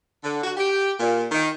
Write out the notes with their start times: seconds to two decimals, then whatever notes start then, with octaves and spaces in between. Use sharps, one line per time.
0.23 D3
0.43 F#4
0.57 G4
1.00 A#2
1.32 D#3